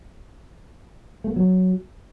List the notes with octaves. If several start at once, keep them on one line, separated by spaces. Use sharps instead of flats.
A3
B3
F#3